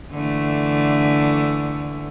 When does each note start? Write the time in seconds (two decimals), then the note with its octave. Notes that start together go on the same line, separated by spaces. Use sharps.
0.11 D3 E3 A3